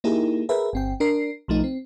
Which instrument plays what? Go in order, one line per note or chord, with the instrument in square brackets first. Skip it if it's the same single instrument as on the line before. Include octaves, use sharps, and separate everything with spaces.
[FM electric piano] A#3 D#4 E4 G4 G#4 A#4
G#4 A#4 B4 E5
G1 C4 G5
D4 A#4 C7
B1 F3 A3 D#4
C4